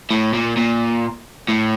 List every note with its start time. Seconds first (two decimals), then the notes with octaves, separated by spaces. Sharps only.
0.11 A2
0.33 A#2
0.56 A#2
1.48 A2